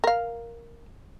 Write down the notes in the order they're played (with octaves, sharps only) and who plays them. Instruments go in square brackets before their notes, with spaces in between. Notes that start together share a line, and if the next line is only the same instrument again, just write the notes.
[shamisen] A#4 F5